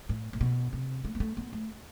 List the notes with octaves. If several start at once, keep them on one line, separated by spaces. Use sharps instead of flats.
A2
A2
B2
C3
A3
B3
A3
B3
A3